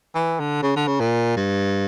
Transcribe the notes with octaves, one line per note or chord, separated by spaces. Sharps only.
E3
D3
C#3
D3
C#3
A#2
G2